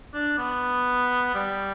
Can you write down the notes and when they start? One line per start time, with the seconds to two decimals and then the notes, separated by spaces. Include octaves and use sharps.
0.14 D4
0.38 B3
1.35 G3